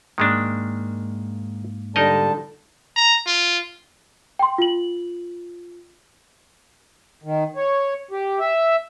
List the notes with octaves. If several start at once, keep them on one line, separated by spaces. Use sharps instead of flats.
G#2 D#3 G#3 A#3 D4
D3 G3 D#4 A#4 D#5 A5
A#5
F4
G5 C6
F4 F#7
D#3
C#5
G4
E5